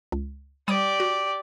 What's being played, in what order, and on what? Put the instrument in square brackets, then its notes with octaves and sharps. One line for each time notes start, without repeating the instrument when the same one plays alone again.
[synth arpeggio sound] C#2
[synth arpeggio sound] G3 D#6 D#7 [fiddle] G4 D5
[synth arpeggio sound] F#4